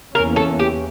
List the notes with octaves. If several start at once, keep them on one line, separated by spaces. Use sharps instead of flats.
E2 E3 A#3 C#4 A#4
A4
G4